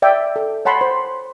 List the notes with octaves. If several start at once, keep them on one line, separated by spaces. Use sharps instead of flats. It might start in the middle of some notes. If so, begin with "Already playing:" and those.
D5 E5 G5
A4
C#5 F#5 A5 B5 C6
C5